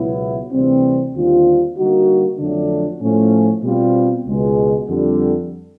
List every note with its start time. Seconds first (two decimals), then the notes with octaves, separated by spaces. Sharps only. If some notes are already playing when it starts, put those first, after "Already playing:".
Already playing: C#2 B2 F#3 B3 E4
0.51 D2 C3 E3 G3 C4
1.13 D#2 D3 G3 C4 F4
1.77 D3 G3 A#3 D#4 F#4
2.38 F2 D3 F#3 A3 D4
3.01 A2 F3 A3 C#4
3.62 B2 G3 C4 F4
4.26 C#2 B2 G#3
4.88 F2 D3 G3